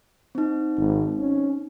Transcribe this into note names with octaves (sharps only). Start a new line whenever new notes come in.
C4 D#4
G#1
C#4